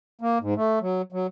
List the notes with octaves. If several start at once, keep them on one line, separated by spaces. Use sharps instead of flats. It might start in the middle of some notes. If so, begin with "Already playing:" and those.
A#3
G#2
A3
F#3
F#3